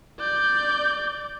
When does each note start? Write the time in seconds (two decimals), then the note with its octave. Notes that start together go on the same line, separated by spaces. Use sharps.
0.20 D5 G6